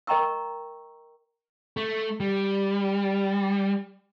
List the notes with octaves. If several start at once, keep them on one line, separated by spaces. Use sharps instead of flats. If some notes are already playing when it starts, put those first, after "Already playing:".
A#4 D#5 G5 A#5 C#6 E6
A3
G3